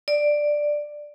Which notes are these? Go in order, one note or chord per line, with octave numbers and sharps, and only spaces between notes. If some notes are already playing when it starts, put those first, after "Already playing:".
D5